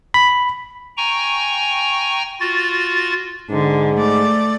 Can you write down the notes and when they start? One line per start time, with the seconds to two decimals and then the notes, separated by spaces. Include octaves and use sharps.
0.14 B5
0.97 G5 G#5 A#5 C#6
2.40 F4 F#4 A6
3.50 G#2 D3
3.96 A3 D5